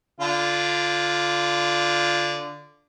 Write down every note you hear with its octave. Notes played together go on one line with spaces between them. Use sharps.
D3 F4